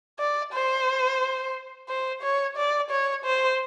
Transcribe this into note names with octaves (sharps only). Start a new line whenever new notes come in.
D5
C5
C5
C#5
D5
C#5
C5